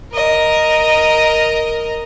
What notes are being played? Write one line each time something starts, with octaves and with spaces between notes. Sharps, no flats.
A#4 D#5